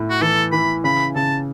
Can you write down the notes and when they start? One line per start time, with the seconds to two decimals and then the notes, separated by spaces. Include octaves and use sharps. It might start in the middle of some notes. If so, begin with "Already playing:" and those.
Already playing: A2 E4
0.10 F#4
0.21 E3 A4
0.52 E3 B5
0.84 C#3 B5
1.16 C#3 A5